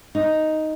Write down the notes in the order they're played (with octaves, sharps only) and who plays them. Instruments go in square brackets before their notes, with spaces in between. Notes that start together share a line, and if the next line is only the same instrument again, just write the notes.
[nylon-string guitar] D#4